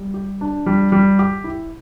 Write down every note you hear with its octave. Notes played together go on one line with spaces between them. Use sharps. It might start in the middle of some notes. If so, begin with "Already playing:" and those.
Already playing: G3
G4
D4
G3
G3
G4
E4